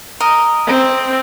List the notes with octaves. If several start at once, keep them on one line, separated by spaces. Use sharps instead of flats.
A#4 D#5
C4